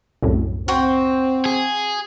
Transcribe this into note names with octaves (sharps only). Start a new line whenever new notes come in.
C2 F#2 A2
C4 F#4 C5 G5
G#4